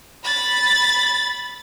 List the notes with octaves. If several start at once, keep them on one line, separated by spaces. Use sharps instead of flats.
B5 A6